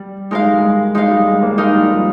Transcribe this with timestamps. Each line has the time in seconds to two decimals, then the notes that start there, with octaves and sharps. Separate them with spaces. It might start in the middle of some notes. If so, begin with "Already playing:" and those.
Already playing: G3
0.31 G#3 D#4 A#4 F5
0.45 G3
0.58 G#3
0.95 G#3 D#4 A#4 F5
1.11 G3
1.27 G#3
1.43 A#3
1.58 G#3 D#4 A#4 F5
1.75 G3
1.91 F3